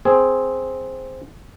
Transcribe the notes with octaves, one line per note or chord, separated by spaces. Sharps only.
C4 G#4